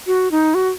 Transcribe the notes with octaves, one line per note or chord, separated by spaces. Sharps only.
F#4
D#4
F#4